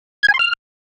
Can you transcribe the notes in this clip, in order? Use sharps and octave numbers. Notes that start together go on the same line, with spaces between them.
G#6
G#5
C6
F6